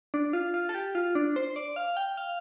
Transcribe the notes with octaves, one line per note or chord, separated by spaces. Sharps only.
D4
F4
F4
A4
G4
F4
D4
C5
D5
F5
G5
F5